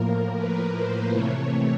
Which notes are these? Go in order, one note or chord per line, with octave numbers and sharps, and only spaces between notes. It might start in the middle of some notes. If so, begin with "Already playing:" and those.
Already playing: A2 F3 A#3 A#4
B4
C5
C3 E3 A3 C#5